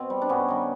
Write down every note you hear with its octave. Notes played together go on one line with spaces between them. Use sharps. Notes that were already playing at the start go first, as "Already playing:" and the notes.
Already playing: B2 C4
G3
D4
G2 B3 C#4
D#3 G3